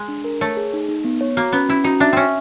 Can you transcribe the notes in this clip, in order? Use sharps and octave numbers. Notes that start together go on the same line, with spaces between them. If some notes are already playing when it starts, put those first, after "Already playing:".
Already playing: G#3
D4
A#4
A3 C#5
G#4
D#4
D#4
B3
C#5
A#3 F#4
B3 C#4
C#4 E4
D#4 F#4
D4 E5
C4 C#4 E5